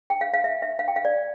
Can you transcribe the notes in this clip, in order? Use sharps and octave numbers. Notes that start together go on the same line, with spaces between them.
G5
F5
F5
E5
E5
F5
G5
F5
D5